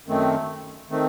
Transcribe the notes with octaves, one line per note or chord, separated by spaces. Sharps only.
F#2 D#3 A3 C4
D#3 A3 C4